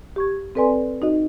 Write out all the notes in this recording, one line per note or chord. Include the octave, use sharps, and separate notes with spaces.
G4 C#6 G#6
C4 A4 B4 D5 G#5 C6
D#4 F#4 D#5